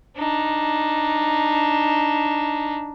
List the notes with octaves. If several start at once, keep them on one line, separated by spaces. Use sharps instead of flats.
D4 D#4